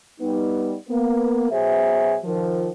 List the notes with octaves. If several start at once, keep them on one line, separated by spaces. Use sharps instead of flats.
G3 B3 D#4
A#3 B3
B2 F#3 G#4 C5 E5
D#3 F3